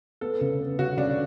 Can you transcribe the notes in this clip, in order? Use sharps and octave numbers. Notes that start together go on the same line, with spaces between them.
B3 A4
C#3
B3
C#3 F#4
C#3 D4